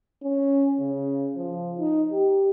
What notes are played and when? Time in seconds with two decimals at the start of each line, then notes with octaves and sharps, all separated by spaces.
0.22 C#4
0.79 C#3
1.36 F3
1.78 D#4
2.12 G4